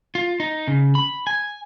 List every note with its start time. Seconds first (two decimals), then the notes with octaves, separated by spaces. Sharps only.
0.15 F4
0.40 D#4
0.68 C#3
0.95 B5
1.27 G#5